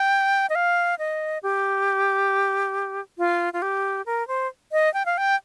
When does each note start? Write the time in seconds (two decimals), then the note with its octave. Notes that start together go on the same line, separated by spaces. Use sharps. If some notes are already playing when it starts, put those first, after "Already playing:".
Already playing: G5
0.50 D#5
0.55 F5
0.99 D#5
1.43 G4
3.18 F4
3.53 F4
3.62 G4
4.06 A#4
4.28 C5
4.72 D#5
4.94 G5
5.06 F5
5.18 G5